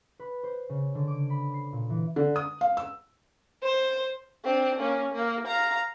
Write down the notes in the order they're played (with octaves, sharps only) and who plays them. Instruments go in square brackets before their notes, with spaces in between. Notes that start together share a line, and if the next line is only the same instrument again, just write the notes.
[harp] B4
C5
C#3
D3
D6
B5
C7
A#2
E3
[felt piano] D3
D#6
F5
E6
[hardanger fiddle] C5
[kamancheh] C4 D4
A#3 C#4
A#3
F5 A#5